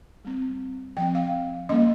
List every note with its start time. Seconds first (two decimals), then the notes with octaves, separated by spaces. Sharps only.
0.25 G3 C4
0.97 F3 C4 G5
1.15 F5
1.69 G3 A#3 C#4 D#5